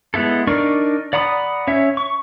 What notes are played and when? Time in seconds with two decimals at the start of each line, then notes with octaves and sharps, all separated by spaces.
0.14 G#3 B3 E4 A4
0.47 D4 D#4 A#4 D5 C#6
1.13 D5 F#5 A#5 B5 D#6
1.67 C#4 C#5 E5
1.97 C#6